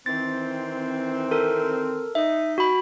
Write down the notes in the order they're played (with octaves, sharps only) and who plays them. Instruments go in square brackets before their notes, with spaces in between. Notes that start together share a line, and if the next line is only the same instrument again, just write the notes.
[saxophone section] D#3 E3 C4 [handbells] A6
[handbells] A4 A#4
[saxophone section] D#4 [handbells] E5
[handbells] F#4 B5